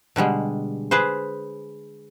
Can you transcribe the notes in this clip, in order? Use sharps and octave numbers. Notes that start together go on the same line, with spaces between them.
B2 D3 G3 G#3
G#4 B4 C5